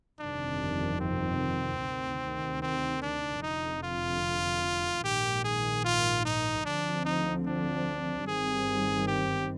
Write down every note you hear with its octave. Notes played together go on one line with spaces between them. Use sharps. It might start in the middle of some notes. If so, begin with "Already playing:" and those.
G1 F2 C3 D#3 D4
C4
D2 C3 D#3
C4
D4
F1 F2 D3 D#4
F4
A#1 G#2 D#3 G4
G#4
F4
D#4
D2 D3 F3 C4 D4
D#4
D4
G1 G2 D#3 G3 C4 G#4
G4